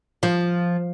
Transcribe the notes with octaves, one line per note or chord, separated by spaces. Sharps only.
F3